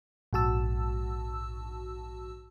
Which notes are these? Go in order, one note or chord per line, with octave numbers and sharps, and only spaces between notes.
A#1 G#2 F#4 A5 E6